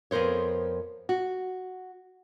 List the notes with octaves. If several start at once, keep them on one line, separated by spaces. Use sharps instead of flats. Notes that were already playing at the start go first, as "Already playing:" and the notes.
F2 B3 A#4 C5 C#5
F#4